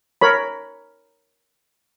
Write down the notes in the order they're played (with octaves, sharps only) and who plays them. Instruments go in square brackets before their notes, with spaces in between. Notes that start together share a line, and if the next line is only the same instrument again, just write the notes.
[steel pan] A#4 C#5 B5